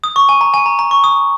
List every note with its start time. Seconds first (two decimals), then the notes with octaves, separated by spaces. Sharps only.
0.04 D#6
0.16 C#6
0.29 G#5
0.41 A#5
0.54 G#5
0.66 A#5
0.79 A#5
0.91 C#6
1.04 D#6